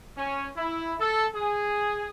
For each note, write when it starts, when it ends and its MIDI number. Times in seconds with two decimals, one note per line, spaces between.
0.17 0.48 61
0.57 0.93 64
0.99 1.25 69
1.34 2.10 68